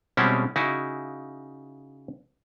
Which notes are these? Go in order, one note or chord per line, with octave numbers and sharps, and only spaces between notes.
B2 G3 G#3 C4 C#4 E4
C#3 D#4 E4 F#4